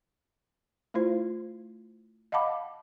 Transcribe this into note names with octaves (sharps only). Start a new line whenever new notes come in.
A3 E4 F4 C5
D#5 F5 F#5 A5 B5 D6